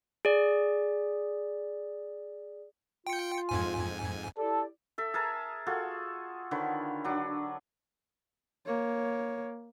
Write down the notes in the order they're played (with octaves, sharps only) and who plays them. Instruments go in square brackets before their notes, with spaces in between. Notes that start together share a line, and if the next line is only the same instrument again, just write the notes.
[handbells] G#4 D5
[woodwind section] F4 [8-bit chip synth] G5 C#7
[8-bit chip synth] F2 G#2 G#5
[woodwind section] E4 G4 D5 [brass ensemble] A4
[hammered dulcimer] A4 E5
G#4 A#4 A5 A#5
F4 F#4 G#4 A4
D3 D#3 B4 C#5
F#3 D4
[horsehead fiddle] A#3 C#5